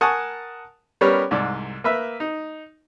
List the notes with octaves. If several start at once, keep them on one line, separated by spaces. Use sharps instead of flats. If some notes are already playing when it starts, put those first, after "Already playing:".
A#4 F#5 G#5 A5 C#6 D#6
G3 B3 C#4 G4 A#4 C#5
C2 G#2 D5
A#3 B4 E5
D#4